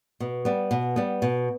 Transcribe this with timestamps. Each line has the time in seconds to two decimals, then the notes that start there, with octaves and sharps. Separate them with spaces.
0.20 B2
0.45 G3 B3
0.71 B2
0.96 G3 B3
1.22 B2